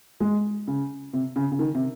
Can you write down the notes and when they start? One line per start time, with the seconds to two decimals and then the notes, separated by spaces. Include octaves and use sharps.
0.20 G#3
0.67 C#3
1.13 C3
1.36 C#3
1.52 C#3
1.59 D#3
1.75 C3